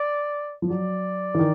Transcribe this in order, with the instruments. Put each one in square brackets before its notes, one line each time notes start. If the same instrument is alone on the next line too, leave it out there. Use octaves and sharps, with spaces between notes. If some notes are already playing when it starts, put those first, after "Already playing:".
Already playing: [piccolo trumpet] D5
[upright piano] F3
[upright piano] F#3 [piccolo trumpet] D5
[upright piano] E3
D#3